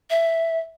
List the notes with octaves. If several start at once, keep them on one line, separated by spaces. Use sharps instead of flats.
E5